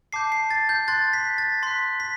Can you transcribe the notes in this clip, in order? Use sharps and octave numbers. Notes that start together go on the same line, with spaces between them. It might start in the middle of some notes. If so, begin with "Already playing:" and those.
A5 D6 G6 C7
C7
A6
G6
C6 F#6 A6
B6
A6
C6 F#6 B6
B6